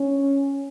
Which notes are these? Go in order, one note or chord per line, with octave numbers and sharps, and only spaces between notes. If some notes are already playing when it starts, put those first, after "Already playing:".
Already playing: C#4